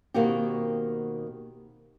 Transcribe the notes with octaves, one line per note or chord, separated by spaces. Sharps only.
B2 D#3 A#3 C4 F#4 G4